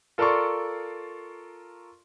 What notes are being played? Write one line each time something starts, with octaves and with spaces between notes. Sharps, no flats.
F4 A4 A#4 D5 C6 C#6